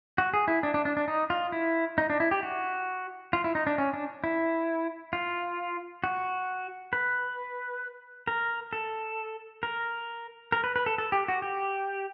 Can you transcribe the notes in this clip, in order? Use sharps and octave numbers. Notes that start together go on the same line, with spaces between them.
F#4
G#4
E4
D4
D4
D4
D4
D#4
F4
E4
D#4
D4
E4
G4
F#4
F4
E4
D#4
D4
C#4
D4
E4
F4
F#4
B4
A#4
A4
A#4
A#4
B4
B4
A4
A4
G4
F#4
G4